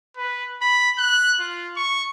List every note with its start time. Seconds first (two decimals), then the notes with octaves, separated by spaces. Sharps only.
0.17 B4
0.62 B5
0.98 F#6
1.40 F4
1.77 C#6